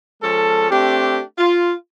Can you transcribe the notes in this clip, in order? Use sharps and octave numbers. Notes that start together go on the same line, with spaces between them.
F3 G#3 C#4 A4
A3 C4 D4 G4
F4